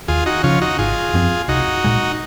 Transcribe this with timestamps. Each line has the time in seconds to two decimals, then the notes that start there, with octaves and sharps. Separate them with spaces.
0.08 D#2 F4 G#4
0.26 D#4 F#4
0.44 C#3 F3 C#4 F4
0.62 D#4 F#4
0.78 G#1 F4 G#4
1.14 F#2 F3 C4
1.48 C2 D#4 F#4
1.84 A#2 G#3